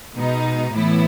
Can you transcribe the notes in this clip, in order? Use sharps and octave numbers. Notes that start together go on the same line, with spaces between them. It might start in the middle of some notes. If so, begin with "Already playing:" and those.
B2 G#3 D#4
A2 E3 B3 E4